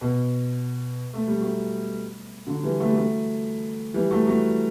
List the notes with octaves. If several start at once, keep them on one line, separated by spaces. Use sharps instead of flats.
B2
A3
G3
F#3 A3
D3 F#3
E3 G3
F#3 A3
G3
F#3 A3
E3 G3
F#3 A3
F#3 A3